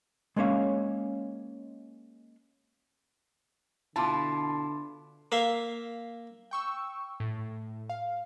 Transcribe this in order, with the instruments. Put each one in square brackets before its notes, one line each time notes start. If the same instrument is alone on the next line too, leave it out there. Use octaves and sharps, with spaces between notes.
[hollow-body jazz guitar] G#3 A#3 C#4 C#5 E5 F5
[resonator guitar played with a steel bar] B2 E4 F4 [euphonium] D3 [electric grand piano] A5 [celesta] B5 C6 D6
[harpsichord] A#3 E5 F5
[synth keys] G5 C#6 E6
A2
F5